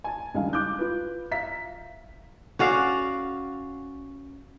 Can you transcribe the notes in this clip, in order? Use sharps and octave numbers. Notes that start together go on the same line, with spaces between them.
G#5 A5
C#2 G2 D#3 F5 G#5
D6 F#6 G6
F4 B4
E5 F5 A#5 B6
C#4 F#4 D5 F5